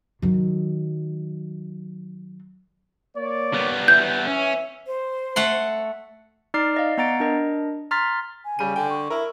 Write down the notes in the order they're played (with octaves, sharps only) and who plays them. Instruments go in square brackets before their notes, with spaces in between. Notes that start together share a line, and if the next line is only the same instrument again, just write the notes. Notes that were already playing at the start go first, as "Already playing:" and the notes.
[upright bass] D#3 F#3
[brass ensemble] A#3 C#5 D5
[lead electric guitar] G3 B3
[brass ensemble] E3 E5 [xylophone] G6
[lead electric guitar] C#4
[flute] C5
[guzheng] A3 F#5 C6
[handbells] D#4 D5 D6 F6 C7
D5 D#5 F5
B3 F#5 A#5 A6 D7
D4 A#4 D#5
A#5 C6 F6 A6 B6
[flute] G#5
[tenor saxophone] C#3 [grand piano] G3 D#7
[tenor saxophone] D3 [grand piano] G5
[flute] C#6
[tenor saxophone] E4 [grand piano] A#4